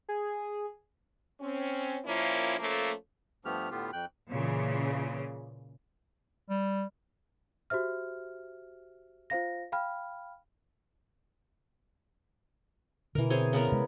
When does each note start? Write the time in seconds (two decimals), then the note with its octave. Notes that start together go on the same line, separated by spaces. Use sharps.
0.09 G#4
1.41 C4 C#4
2.05 A#2 F3 A#3 C#4 E4
2.59 F3 A3 A#3 C#4 A4
3.45 G2 F3 A3 B3 G4 F6
3.71 A2 D3 B3 F4 G4
3.93 F2 G5 F#6
4.30 A#2 C#3 E3
6.50 G3
7.70 F#4 G4 C5 E5 F6
9.30 F4 C5 F5 A#6
9.72 F5 G5 B5 F6
13.15 B2 D3 E3 A#4
13.30 C4 G#4 C#5
13.53 C#3 B3 A#4
13.72 C3 G#3